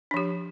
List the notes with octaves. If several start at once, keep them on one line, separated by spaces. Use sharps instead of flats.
F3 D4 G4